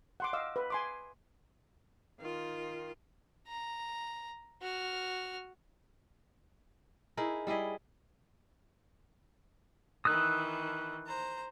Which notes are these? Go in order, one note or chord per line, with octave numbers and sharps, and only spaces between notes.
F#5 C6 D6
D#5 F5 D6 E6
B4
G#5 C6 D6
D#3 F4
A#5
F#4 F6
D#4 E4 G#4 A#4
G3 E4 G#4 D#5
D#3 E3 D#6 E6 F#6
C5 A#5